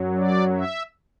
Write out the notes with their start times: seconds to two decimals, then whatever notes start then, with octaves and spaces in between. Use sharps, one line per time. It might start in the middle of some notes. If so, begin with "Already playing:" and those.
Already playing: F#2 F#3
0.18 D5
0.56 E5